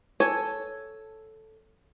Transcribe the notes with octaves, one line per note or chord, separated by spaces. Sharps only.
A4 C#5 G#5